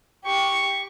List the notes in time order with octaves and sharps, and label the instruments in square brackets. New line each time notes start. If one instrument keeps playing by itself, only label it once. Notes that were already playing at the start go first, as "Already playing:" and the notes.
[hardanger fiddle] G4 C#6